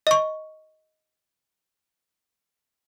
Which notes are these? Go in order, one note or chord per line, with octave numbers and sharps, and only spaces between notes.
D#5 C#6